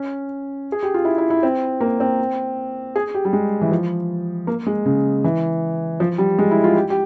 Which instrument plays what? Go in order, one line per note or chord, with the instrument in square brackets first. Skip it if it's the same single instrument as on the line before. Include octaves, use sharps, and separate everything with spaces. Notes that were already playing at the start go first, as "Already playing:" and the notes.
Already playing: [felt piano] C#4
G#4
G4
F4
E4
E4
E4
C4
A#3
C4
G#4
G4
G3
G#3
E3
F3
A#3
G#3
C#3
E3
F3
G3
G#3
E4
F4
G4
G4